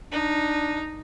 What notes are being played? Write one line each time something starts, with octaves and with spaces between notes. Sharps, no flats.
D4 D#4